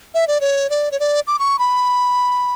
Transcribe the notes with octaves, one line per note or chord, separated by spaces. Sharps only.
E5
D5
C#5
D5
C#5
D5
D6
C#6
B5